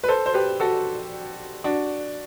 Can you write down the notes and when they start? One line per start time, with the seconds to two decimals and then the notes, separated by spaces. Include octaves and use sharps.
0.04 B4
0.08 A4 C5
0.26 C5
0.34 G4 B4
0.60 F#4 A4
1.64 D4 F#4